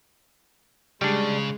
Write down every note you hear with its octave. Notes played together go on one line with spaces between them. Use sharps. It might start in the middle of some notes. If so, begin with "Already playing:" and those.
C#3 G3 G#3 D4